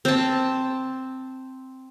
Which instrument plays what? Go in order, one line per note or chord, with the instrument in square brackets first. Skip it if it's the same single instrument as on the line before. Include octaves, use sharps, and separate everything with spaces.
[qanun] C4 A5